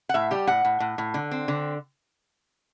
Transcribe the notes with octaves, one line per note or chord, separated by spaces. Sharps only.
F#5
A2 E5
G3 G4
A2 F#5
A2
A2
A2
D3
C4
D3